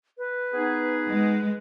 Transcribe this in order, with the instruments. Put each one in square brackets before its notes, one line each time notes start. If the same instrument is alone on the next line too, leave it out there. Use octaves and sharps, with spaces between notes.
[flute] B4
[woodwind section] B3 D#4 G#4
[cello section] G#3